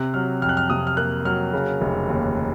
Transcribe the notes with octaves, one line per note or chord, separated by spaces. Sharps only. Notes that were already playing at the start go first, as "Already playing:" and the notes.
Already playing: C3 F#6
F#3 F6
F2 F6
F#6
F6
C3 D#6
F6
A#3 F#6
F#3 F6
C#3
F1
D#2